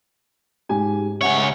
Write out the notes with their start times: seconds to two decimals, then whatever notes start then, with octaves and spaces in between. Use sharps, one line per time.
0.69 G#2 G4 G#5
1.21 C#2 C#5 E5 F#5 G#5